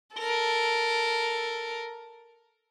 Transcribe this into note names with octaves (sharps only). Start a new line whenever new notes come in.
A4 A#4